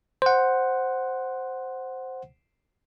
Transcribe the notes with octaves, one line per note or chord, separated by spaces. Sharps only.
C5 F#5